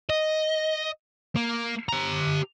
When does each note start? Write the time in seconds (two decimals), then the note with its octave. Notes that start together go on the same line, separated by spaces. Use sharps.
0.10 D#5
1.36 A#3
1.89 G4 A#5